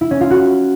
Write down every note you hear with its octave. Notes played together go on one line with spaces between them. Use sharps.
E4
C#4
F4
F#4